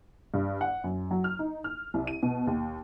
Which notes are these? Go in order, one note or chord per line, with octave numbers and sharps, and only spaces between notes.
G2
F#5
F#2
F#3
F6
D#4
F6
C2
D#7
B2
D#2